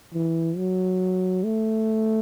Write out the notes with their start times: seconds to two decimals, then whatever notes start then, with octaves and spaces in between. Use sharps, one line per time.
0.14 E3
0.57 F#3
1.44 A3